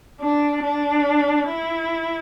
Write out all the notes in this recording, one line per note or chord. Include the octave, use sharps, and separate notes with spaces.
D4
D4
E4